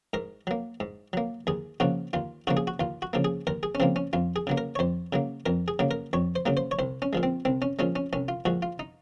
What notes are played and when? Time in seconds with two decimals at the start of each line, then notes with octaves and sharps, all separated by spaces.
0.13 G#2 A#4
0.47 F#3 A#3
0.80 G#2
1.13 F#3 A#3
1.47 D#2 G#4
1.80 C#3 F3 A#3 F#4
2.13 D#2 F4
2.47 C#3 F3 A#3 F#4
2.57 G#4
2.67 F#4
2.80 D#2 F4
3.02 F#4
3.13 C#3 F3 A#3
3.24 G#4
3.47 D#2 A#4
3.63 G#4
3.75 C#4
3.80 C#3 F3 A#3 C4
3.96 C#4
4.13 F2 F4
4.36 G#4
4.47 C#3 F#3 A#3
4.58 A#4
4.75 C#5
4.79 F2 C5
5.13 C#3 F#3 A#3
5.46 F2 A#4
5.68 G#4
5.79 C#3 F#3 A#3
5.91 A#4
6.13 F2 C#5
6.36 C5
6.46 C#3 F#3 A#3
6.57 C5
6.71 C#5
6.79 C2 C5
7.02 C#4
7.13 A#2 F3 G#3
7.23 C4
7.45 C2 C4
7.62 C#4
7.79 A#2 F3 G#3 C#4
7.96 C#4
8.13 C2 C#4
8.28 F4
8.45 A#2 F3 G#3 F#4
8.62 F4
8.79 D#4